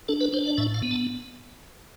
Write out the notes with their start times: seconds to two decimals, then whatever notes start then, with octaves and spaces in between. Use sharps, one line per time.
0.08 D4 A4
0.21 B4
0.33 D4 C5
0.46 D5
0.58 A2 E5
0.74 F5
0.83 B3
0.91 A5